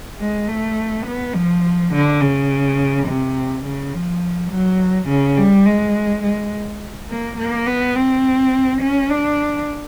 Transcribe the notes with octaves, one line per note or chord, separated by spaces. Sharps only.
G#3
A3
B3
F3
D3
C#3
C3
C#3
F3
F#3
C#3
G3
G#3
G#3
A#3
A#3
B3
C4
C#4
D4